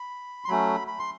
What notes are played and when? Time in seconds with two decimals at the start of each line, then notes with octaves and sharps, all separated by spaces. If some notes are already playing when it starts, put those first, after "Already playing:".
Already playing: B5
0.45 C6
0.48 F#3 A3 C#4 B5
0.88 B5
0.99 C6